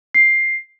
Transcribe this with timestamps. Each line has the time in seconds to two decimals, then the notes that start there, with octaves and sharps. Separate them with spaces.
0.15 C7